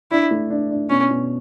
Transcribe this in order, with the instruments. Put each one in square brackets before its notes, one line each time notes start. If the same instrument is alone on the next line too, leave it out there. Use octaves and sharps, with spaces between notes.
[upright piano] D4 [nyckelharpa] E4
[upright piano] A3
D4
D4
[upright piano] B2 [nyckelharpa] C#4
[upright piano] B2